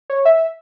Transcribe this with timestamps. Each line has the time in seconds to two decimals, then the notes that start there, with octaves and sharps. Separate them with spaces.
0.10 C#5
0.25 E5